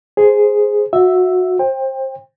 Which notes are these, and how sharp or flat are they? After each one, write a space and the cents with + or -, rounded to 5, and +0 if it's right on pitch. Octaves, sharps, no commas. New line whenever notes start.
G#4 +0 C5 +0
F#4 -20 E5 +0
C5 +25 G5 +20